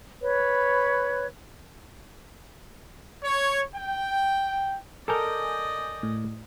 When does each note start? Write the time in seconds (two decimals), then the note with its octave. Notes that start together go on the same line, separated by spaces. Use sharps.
0.22 B4 C#5
3.23 C#5
3.75 G5
5.08 A4 A#4 D5 D#5 G#5 D6 G6
6.03 A2